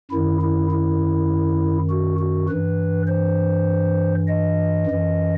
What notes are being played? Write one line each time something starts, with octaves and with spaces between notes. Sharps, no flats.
F#2 D#3 E4
E4
E4
F#4
F#4
G2 E3 B4
C5
D#5
F#2 E3